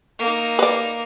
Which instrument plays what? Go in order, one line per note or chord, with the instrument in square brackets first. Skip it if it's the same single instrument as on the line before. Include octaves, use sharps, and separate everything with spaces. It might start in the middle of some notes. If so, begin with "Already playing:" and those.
[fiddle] A#3 D#4
[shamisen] B4 D5